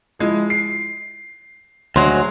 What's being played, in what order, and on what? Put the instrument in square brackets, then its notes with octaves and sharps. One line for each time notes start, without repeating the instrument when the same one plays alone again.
[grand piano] F3 G#3 E4
C7
[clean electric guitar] D2 F#3 G#3 [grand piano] C6